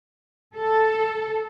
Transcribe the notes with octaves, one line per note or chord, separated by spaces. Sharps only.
A4